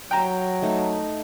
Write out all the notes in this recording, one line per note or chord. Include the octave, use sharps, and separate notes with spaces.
F#3 G5 A#5
A3 D#4